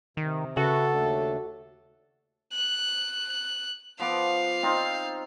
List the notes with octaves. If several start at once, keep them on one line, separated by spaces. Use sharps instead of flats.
C3 D#3
C#3 F#4 A4 B4 E5
D#2 A3 D4
F#6
F3 B3 F5 D6
C4 D#4 F4